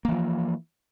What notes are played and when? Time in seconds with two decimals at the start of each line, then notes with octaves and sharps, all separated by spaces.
0.05 A#3
0.08 E3
0.12 F3